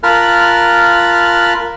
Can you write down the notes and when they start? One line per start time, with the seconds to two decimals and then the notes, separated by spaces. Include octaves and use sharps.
0.03 F4 A#4 A5 B5 F6 F#6